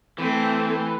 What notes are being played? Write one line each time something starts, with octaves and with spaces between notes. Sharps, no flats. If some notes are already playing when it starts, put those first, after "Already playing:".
E3 A3 C4